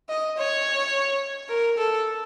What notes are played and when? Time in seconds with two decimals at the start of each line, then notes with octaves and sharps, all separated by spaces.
0.09 D#5
0.38 C#5
1.49 A#4
1.77 A4